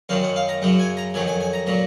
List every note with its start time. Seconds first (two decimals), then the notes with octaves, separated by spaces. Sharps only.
0.09 F#2 D#3 F#3 F5
0.23 F#5
0.36 F5
0.49 A#5
0.62 F#2 C#3 F#3 F#5
0.79 G#5
0.97 A#5
1.14 F2 D#3 F#3 G#5
1.28 G#5
1.41 G#5
1.53 A#5
1.67 A#2 F#3 A#5